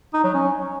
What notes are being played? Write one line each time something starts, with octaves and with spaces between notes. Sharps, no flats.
D#4
F#3
C#4